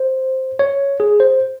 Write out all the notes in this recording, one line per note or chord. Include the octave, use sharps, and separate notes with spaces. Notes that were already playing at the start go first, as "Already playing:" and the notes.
Already playing: C5
C#5
G#4
C5